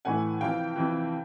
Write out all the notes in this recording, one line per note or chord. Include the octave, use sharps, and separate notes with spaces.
A2 E3 A3 F#5 G#5
F2 C3 E3 F5 G5
F2 C3 E3